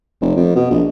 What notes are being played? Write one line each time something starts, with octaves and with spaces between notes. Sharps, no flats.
F1
F2
B2
A#1